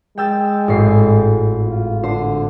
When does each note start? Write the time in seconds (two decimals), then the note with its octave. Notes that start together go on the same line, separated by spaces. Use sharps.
0.18 G#3 G5 E6 A6
0.68 G#1 A2 C7
1.68 F4
2.04 D3 C5